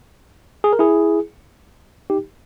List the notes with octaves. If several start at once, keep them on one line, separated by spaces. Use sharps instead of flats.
G#4
A#4
E4 G#4
D#4 G4